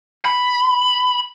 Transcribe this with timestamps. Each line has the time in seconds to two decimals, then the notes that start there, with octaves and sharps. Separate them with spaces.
0.25 B5